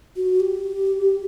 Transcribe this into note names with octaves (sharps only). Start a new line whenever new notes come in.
F#4
G4